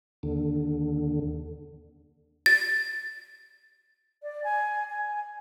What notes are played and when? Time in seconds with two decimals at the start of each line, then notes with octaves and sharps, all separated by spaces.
0.23 D#2 D3
2.46 A6
4.23 D5
4.44 G#5
4.90 G#5